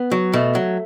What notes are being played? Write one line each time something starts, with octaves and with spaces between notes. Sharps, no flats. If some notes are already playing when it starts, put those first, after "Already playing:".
Already playing: B3
F#3
B2 A3
F#3